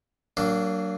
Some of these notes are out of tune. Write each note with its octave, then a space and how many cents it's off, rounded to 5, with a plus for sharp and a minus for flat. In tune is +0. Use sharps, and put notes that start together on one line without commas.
F#3 +30 A#3 -15 D4 +0